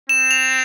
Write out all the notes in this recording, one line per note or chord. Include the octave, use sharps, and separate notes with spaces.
C4 E7
F7